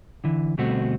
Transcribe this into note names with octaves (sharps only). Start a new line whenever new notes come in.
D3 E3
D2 B2 G3 A3 C4 F#4